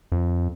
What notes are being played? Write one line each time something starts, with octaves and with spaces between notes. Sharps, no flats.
F2